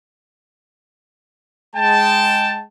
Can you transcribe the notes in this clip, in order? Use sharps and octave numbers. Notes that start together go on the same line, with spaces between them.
G#3 G5 A5